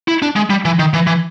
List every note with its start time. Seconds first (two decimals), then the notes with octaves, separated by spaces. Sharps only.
0.08 E4
0.22 D4
0.36 G#3
0.50 G3
0.65 E3
0.79 D#3
0.94 E3
1.07 E3